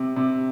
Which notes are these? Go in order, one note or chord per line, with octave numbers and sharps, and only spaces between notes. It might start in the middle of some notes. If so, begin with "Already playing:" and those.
Already playing: C3
C3